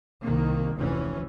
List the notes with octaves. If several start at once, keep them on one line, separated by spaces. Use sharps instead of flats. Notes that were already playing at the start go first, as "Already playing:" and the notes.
C2 D#3 A#3
F1 D2 E3 C#4